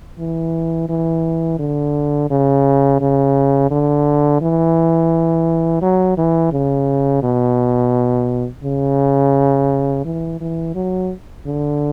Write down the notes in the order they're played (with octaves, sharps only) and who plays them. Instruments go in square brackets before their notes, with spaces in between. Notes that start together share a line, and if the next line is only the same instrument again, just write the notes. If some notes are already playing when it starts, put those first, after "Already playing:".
[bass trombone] E3
E3
D3
C#3
C#3
D3
E3
F#3
E3
C#3
B2
C#3
E3
E3
F#3
D3